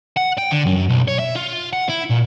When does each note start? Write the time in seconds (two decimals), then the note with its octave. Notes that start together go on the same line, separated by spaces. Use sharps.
0.17 F#5
0.38 G5
0.51 D3
0.66 F#2
0.90 B1
1.08 C#5
1.19 E5
1.36 F4
1.73 F#5
1.89 E4
2.10 A#2